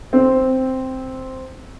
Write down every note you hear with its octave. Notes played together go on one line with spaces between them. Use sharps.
C4